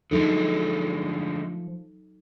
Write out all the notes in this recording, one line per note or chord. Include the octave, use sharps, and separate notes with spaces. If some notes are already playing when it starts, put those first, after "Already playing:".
D3 F3 F#3 G#3 A3 D#4 A4